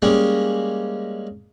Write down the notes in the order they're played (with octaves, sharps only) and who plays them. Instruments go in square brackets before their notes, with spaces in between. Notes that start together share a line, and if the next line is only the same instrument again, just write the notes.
[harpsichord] G3 G#3 A#3 C#4